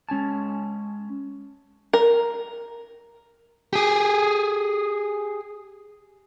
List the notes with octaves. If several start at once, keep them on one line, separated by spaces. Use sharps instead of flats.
G#3 C#4 G#5 A5
A#4
G4 G#4